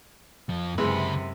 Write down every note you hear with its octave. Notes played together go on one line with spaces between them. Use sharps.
F2 F3
C#2 F#2 C3 E3 G#3 B5